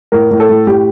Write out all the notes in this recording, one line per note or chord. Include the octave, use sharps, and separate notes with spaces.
A2 A#4
A2
A4
A2
A2 G4